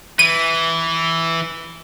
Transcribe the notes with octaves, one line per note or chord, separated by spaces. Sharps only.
E3 D#7